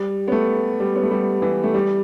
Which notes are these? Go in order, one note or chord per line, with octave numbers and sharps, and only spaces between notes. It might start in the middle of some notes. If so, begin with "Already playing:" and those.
Already playing: G3
B3
A3
G3
B3
A3
G3
E3
A3
G3